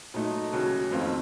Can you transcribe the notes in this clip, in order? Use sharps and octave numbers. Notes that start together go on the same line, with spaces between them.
A#2 F#3 A3 D#4
D#2 C#3 F#3
F2 D#3 A3 C4 F4